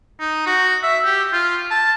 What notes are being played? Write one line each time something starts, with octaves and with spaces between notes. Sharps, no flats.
D#4
F#4
E5
G4
F4
A5